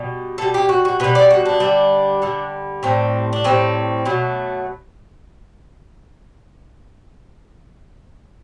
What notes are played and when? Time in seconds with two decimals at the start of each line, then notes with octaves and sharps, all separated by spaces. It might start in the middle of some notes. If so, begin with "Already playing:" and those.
Already playing: B2 G3
0.38 B2 G3 A4
0.54 G4
0.69 F#4
0.85 F#4
1.00 B2 G3 B4
1.15 D5
1.31 F#4
1.45 D4
1.60 D3 G3
2.22 D3 G3
2.83 A2 G3 C4
3.33 D4
3.44 A2 G3 C4
4.05 B2 F#3 A3